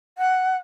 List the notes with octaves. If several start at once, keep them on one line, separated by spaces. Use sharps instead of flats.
F#5